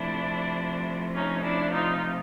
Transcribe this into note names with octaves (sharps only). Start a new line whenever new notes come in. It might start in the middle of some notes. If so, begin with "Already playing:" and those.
Already playing: C3 F3 A3 D4 E4
C#4 D#4
D4 E4
D#4 F4